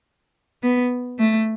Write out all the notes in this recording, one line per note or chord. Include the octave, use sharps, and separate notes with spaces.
B3
A3